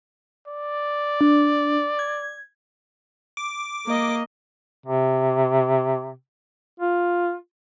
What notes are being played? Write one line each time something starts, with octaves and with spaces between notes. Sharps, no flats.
D5
D4
G#6
D6
A#3 D#5
C3
F4